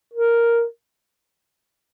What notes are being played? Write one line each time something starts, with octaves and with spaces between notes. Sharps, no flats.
A#4